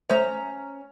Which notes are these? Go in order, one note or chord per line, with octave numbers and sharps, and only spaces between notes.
A3 C#4 C5 C#5 A#5